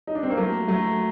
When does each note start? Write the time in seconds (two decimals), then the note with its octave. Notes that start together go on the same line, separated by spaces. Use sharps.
0.07 D#4
0.15 D4
0.23 C4
0.30 A#3
0.37 F#3 A3
0.68 F#3 A3